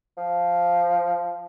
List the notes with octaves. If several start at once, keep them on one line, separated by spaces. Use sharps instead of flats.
F3